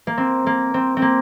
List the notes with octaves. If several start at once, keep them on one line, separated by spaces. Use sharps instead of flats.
A#3
C4
A#3
C4
C4
A#3